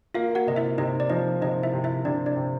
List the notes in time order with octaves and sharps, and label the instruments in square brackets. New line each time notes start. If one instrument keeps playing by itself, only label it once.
[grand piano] A#3 [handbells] F4 F5
[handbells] F#4 F#5
[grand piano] C3 [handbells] D#5
[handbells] E4 E5
[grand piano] C3 [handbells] D#4 D#5
[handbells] D5
[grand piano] F3 [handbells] D#4 D#5
[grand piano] C3 [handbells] D#4 D#5
[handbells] E4 E5
[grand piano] C3
[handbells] E4 E5
[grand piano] C3 [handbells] D4 D5
[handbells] D4 D5
[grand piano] C3